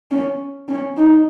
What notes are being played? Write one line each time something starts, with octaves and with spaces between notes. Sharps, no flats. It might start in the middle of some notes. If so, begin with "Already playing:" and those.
C#4
C#4
D#4